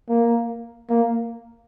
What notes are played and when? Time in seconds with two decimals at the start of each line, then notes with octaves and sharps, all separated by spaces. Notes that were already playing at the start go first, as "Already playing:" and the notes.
0.09 A#3
0.90 A#3